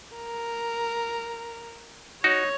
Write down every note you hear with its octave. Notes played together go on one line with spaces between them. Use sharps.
A#4
D#4 F#4 C#5